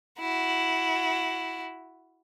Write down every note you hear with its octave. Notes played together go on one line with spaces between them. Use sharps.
E4 F#4